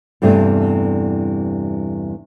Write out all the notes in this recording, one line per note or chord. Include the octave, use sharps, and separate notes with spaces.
E2 G2 C3 E3 G3 A3